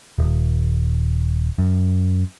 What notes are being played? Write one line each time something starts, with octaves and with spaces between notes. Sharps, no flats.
D#1
F#2